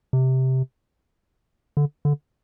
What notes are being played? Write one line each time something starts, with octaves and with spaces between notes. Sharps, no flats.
C3
D3
D3